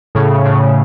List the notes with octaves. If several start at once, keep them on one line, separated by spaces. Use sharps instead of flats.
A2 C#3
A2 C#3